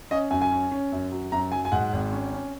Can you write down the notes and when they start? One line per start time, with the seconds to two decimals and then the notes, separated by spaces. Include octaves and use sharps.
0.11 C#4 D#5
0.31 F#2 G#5
0.41 G#5
0.51 C#4
0.71 C#4
0.92 F#2
1.11 F#3
1.32 F#2 A#5
1.52 F#3 G#5
1.65 G#5
1.72 G#2 F#5
1.93 G#1
2.12 C#4
2.33 C#4